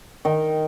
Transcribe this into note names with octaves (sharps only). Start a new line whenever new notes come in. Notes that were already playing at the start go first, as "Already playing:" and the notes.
D#3